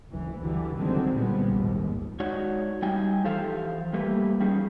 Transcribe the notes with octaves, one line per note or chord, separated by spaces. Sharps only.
F#1 D2 E3
D3 E3 F#3 G3
C#2 D3 D#3 F#3 G#3 C4
A#2 F3 G3 G#3 B3
A#1 D#2 G#2
G#3 D#4 F#4 C#5 D5
G3 D#4 G5 G#5
E3 F3 G4 A4 C5 F5
G3 A3 A#3 G4 B4
F3 G3 C#4 D#4 G#4